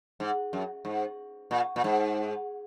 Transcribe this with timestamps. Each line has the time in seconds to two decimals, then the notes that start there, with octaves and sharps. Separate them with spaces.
0.20 G#2
0.53 F#2
0.85 G#2
1.51 A#2
1.76 A#2
1.84 G#2